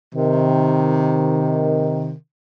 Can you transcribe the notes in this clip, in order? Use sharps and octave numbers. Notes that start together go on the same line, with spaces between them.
C3 D#3